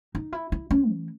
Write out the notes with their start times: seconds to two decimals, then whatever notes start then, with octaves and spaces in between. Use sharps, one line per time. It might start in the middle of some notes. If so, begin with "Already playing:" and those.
0.15 D#4
0.33 E4
0.52 E4
0.71 C#4
0.90 E3